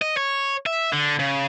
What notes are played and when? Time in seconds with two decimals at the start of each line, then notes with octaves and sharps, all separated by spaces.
0.02 D#5
0.17 C#5
0.66 E5
0.93 D3
1.19 C#3